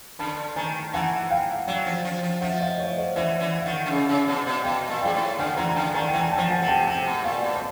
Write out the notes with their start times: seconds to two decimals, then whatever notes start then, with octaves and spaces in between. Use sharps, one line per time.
0.19 D3 A5 B5
0.56 D#3 G#5 A#5
0.94 E3 F#5 G#5
1.30 F5 G5
1.68 F#3
1.86 F3
2.05 F3
2.23 F3
2.41 F3 E5 F#5
2.61 D#5 F5
2.78 C#5 D#5
2.97 C5 D5
3.16 E3 D5 E5
3.40 E3
3.53 F#5
3.60 F5
3.66 D#3 E5 F#5
3.86 D3
3.90 C#3
4.09 C#3
4.28 B2
4.46 B2
4.64 B2 F5 G5
4.89 A#2
5.01 G#2 F5 G5
5.14 A2
5.39 D3 F#5 G#5
5.57 E3 G#5 A#5
5.69 A#5
5.76 D3 G5 A5
5.94 D#3 G#5 A#5
6.08 E3 G5
6.20 G#5
6.32 G5 A5
6.38 F3
6.50 F#5 G#5
6.62 C3
6.68 G5 A5
6.86 C3 G5 A5
7.06 B2
7.24 A#2 F5 G5
7.43 B2
7.55 A5